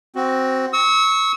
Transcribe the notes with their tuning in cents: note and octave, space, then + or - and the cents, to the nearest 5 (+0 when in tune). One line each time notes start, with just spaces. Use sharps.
C4 +0 F#4 +10
C#6 +0 E6 -35